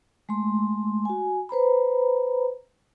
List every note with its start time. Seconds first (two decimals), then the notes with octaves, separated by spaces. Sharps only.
0.29 G#3 A3 C6
1.05 F#4 G#5
1.49 B4 C5 A#5 B5